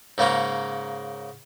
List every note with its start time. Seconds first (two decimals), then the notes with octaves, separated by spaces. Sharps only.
0.18 G#2 C#3 A#3 C#4